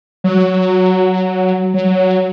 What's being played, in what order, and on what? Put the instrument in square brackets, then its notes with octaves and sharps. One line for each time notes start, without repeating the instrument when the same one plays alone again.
[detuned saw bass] F#3
F#3